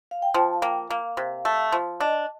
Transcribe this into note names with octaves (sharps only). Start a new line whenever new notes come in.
F5
G5
F3 A5
F5
A#3 G5
A#3 F5
C3
A3
F3
D4 D#5